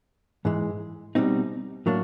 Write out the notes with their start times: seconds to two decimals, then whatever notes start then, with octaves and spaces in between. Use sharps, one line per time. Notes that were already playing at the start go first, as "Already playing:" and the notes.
0.45 G#2 E3 G#3
1.15 B2 G3 C4 D#4
1.86 A2 F#3 A#3 D4